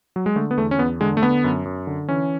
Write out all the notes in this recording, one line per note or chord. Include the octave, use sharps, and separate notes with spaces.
F#3
G#3
D3 A3
B3
E2 A3
C#4
E2 B3
D3 G#3
A3
D3 B3
F#2
F#2
D3
E3 C#4